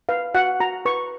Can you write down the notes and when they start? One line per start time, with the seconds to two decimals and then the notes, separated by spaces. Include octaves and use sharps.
0.09 B4 F5
0.35 F#4 F#5
0.60 F#4 A#5
0.85 B4 C#6